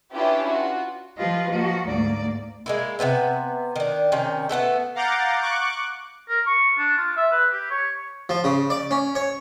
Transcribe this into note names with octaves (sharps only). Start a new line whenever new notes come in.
C#4 D4 E4 F4 G4 B4
F4 F#4
F3 F4 G4 B4 D#5
F3 A#3 F#4
D2 G#2 A#3 D5
G#3 A#3 E4
C3 F#3 B3 E5
D#3 D4
C3 D#3 C#4
A3 B3 E4 A4
F5 F#5 A#5 D6 G6 A6
C#6 D6 F#6
A#4
C#6
D4
F4
E5
B4
G4
C#5
F3
C#3
D5
C#4
C#5